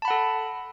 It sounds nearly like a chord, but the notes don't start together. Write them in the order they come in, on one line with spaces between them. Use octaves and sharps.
A5 B5 F#5 A4